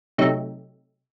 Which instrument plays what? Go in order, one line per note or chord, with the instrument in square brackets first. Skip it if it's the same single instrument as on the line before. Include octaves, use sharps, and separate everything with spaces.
[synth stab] C3 F#3 A3 D#4